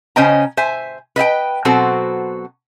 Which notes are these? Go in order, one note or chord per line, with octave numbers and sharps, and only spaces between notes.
C#3 C#4 C5 D#5 G5 A#5
C5 E5 G#5
B4 D#5 E5 G5
B2 F#3 C4 F#4 A4 C5